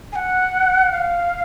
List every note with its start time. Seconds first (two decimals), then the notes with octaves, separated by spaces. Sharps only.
0.12 G#5
0.16 F#5
0.92 F5